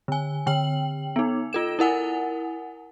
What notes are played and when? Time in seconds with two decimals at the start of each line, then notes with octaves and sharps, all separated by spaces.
0.08 D3 G#5
0.46 D3 G5 F#7
1.16 B3 D#4
1.53 F4 A4 E7
1.79 E4 A#4 F#5 G#5